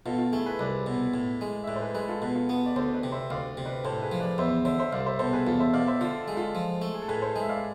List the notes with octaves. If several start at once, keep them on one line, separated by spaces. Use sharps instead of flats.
B2 F4 A4
F4
A3 E4 G#4
G#4 B4
C2 B4 D5
B2
A2
G#3
E5
A2 B4 D5
C5
G#4 B4
G#3 G#4 B4
F4 A4
B2 G#4 B4
F4 A4
B3 F4 A4
D5
D2 A4 C5
B4 D5
C3
C5 E5
D2 D5 F5
C3
B4 D5
A2 A4 C5
G#4 B4
F3
B4 D5
E2 C5 E5
D3 C5 E5
C5 E5
C2 D5 F5
C5 E5
B2 A4 C5
G#4 B4
E2 F4 A4
C5 E5
B2 D5 F5
C5 E5
D3 F4 A4
G#3
F4 A4
F3
A3
G#4
A4
A2 G#4 B4
A4 C5
G#3
E5
D5 F5